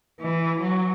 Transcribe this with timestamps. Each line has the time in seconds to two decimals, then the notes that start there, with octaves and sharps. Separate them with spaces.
0.20 E3
0.60 F#3